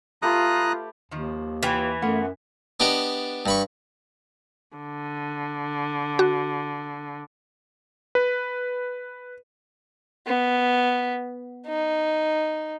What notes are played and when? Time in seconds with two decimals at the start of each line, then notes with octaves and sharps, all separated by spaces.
0.22 A3 F4 G4 B4 A#5 D#6 F#6
1.11 D#2 D#3 F3
1.63 E3 F4 B4 G5
2.02 F#2 A3 B3 F4 F#5
2.80 B3 D4 G4 D5 D#5
3.46 G2 B5 C#6
4.77 D3
6.19 F#4
8.15 B4
10.27 B3
11.67 D#4